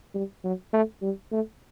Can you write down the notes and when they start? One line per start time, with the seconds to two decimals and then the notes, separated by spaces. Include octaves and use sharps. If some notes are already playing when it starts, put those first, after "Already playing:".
0.14 G3
0.44 F#3
0.73 A3
1.02 G3
1.32 A3